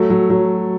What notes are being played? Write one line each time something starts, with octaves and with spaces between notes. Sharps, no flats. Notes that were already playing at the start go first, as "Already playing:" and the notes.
Already playing: F#3 A3
F#3
F#3